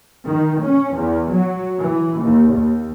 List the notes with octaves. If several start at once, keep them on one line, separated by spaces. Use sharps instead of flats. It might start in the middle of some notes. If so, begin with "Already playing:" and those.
D#3
C#4
E2
F#3
E3
D#2
D#2